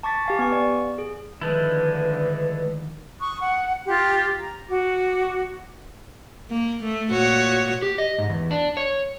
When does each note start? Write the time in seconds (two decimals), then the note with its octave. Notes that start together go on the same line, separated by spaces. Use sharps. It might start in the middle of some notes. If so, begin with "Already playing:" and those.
0.03 A5 C#6 D6 A6 B6
0.26 G4 F5 G#5
0.39 B3 G#5 C#6
0.52 D5
0.98 G#4
1.41 D3 D#3 F3 G#3 A3 E4 B4
3.20 C#6 D#6 F#6
3.42 F#5
3.87 F4 G4 C6 F#6
4.39 A#5
4.68 F#4 D6
6.51 A#3
6.83 A3
7.12 A#2 F#4 C#5
7.82 G4
7.98 D#5
8.18 G#2
8.30 E2
8.51 D4
8.77 C#5